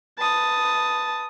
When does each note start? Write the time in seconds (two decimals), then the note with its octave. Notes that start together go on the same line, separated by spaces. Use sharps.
0.19 B4 A5 D#6